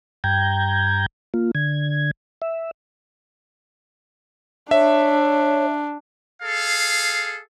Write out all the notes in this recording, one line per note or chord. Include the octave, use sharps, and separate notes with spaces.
G2 G5 A#5 G6 G#6
A#3 F4
D3 G#6
E5
D4 C#5 E5
G#4 A4 F5